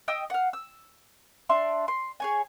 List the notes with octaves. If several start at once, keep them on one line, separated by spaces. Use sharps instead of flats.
D#5 G5 D#6 E6
F5 F#5
E6
D4 E5 C6
C6
G#4 C#5 G#5